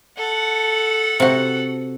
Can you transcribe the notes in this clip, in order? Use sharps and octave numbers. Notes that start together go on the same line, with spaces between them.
A4 F#5
C3 F#4